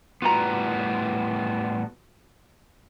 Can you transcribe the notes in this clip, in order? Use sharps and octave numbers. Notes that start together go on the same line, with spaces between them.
A2 G3 B3 F4 F#4 A#5